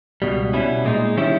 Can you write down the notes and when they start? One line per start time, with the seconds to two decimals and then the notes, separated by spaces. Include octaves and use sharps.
0.22 C#2 B2 G3
0.53 B2 G3 C#4 E4
0.85 A#2 G#3 D#4
1.17 D#3 G3 C#4 E4